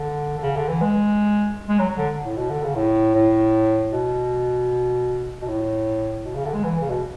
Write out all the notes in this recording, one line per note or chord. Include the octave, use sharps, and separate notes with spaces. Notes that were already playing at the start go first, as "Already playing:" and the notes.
Already playing: D3
D3
C#3
D3
E3
G#3
G#3
F#3
D3
A2
B2
D3
C#3
A2
A2
B2
B2
A2
B2
C#3
D3
G#3
E3
C#3
B2